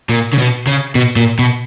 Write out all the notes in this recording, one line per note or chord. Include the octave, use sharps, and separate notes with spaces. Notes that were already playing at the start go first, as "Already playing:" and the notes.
A#2
C#3
B2
C#3
B2
A#2
B2